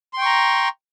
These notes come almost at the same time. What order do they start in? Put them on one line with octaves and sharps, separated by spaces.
C6 G5 C#6 A#5